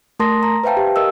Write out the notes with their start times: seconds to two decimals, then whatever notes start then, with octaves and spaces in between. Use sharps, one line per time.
0.19 A3 A#4 A5 C6 D#6 A#6
0.43 A#5
0.64 B4 C5 E5 F5 G5 A5
0.77 G4
0.96 A#4 D#5 F5 E6